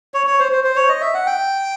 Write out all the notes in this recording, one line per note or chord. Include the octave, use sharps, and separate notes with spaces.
C#5
C#5
C5
C5
C5
C#5
D#5
E5
F#5
G5